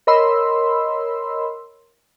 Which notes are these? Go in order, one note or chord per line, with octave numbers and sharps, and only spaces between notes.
A#4 C#5 D#5 B5 C6 E6